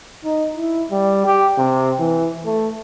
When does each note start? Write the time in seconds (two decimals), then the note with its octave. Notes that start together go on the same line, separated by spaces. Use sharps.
0.24 D#4
0.57 E4
0.91 G3
1.26 G4
1.58 C3
1.99 E3
2.46 A3